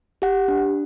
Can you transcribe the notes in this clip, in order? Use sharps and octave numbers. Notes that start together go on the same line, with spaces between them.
G4 F#5
D4